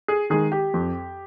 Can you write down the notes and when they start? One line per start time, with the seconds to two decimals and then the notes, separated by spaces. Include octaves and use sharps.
0.08 G#4
0.30 D#3 G#3 G#4
0.52 G4
0.74 F2